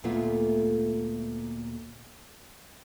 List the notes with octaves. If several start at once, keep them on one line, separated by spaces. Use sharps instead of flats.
D2 A#2 A3 B3 F4 E5